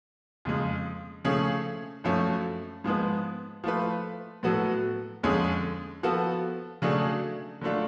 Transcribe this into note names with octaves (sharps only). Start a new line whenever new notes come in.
F2 C#3 G#3
C#3 F3 A3 C#4 G#4
F#2 F3 A3 C#4
G#2 F3 G#3 B3
F3 A3 F4 B4
A2 F#3 B3 F#4 A4
F2 D3 G#3 C#4 G#4
F3 B3 F#4 A4
C#3 F#3 A3 D4 G#4
D3 F#3 A3 D4 F4